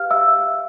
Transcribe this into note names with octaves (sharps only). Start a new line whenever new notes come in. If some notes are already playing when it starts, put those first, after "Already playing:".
Already playing: G4 B4 F5 F6
E5 E6